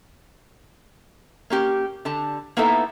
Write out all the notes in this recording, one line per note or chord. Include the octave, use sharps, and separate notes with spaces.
A#3 C#4 G4
D3 G4 A5
A#3 B3 D#4 E4 A4 E5